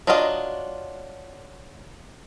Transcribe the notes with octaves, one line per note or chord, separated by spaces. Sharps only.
F#3 D4 F4 A#4 D#5